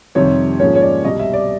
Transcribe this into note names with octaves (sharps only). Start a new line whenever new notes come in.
F2 C3 D#3 G3 C#5
G#2 F3 A#3 C#4 C#5
C#5
D5
C2 B2 G3 D#5
E5
D5